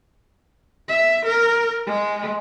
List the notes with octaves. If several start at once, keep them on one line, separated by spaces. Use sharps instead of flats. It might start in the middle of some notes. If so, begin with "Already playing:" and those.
E5
A#4
G#3